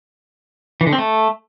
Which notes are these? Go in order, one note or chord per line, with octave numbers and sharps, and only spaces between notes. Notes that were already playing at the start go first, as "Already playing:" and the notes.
E3
D3
C4
A3